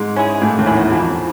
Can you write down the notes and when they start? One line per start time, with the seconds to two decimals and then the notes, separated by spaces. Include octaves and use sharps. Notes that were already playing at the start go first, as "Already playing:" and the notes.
Already playing: G#2 G#3
0.16 C#4 E4 G#4
0.41 A2 A3 A#3
0.58 D#2 D#3
0.66 C#4 E4 G#4
0.75 E2 E3
0.91 F2 F3 A#3